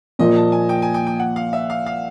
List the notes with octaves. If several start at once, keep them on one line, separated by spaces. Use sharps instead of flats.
A#2 F3 A#3 D#5
A5
G#5
G5
G#5
G5
G5
F#5
F5
E5
F5
F5